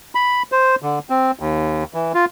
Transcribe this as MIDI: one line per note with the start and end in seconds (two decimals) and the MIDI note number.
0.15 0.43 83
0.52 0.75 72
0.82 0.99 50
1.10 1.31 60
1.39 1.84 39
1.94 2.12 52
2.14 2.25 65